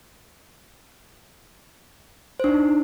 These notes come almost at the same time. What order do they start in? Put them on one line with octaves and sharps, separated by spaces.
C5 D4 D#4